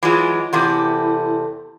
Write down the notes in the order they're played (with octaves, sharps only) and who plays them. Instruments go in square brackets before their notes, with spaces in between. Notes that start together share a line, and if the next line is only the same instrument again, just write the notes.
[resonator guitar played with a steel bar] E3 F#3 G#3 [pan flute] F4
[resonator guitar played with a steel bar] E2 C3 A3 [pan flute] E4